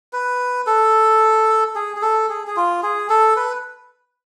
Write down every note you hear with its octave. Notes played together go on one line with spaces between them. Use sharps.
B4
A4
G#4
G#4
A4
G#4
G#4
F4
G#4
A4
B4